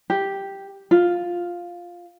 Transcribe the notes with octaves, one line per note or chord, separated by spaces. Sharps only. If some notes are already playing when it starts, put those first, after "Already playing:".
G4
F4